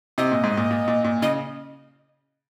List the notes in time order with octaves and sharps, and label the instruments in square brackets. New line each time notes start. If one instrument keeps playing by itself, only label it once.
[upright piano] C3 [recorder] D#5
[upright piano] A#2
G#2
A#2
A#2
A#2
A#2
[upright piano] C#3 [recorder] D#5